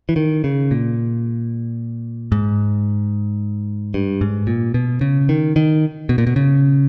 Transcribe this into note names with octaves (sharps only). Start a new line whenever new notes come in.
E3
D#3
C#3
A#2
G#2
G2
G#2
A#2
B2
C#3
D#3
D#3
B2
A#2
B2
C#3